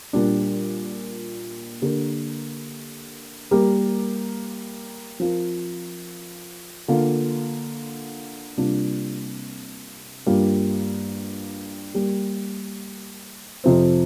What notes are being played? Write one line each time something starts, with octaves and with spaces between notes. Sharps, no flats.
A#2 G3 D4
D3 A#3 D4 G4 A#4
G3 A#3 G4 A#4
F3 C4 F4 A#4
D3 A#3 F4
C3 G3 A#3 D4 F4
G2 G3 A#3 F4
G3 A#3 G4
F2 C3 F3 C4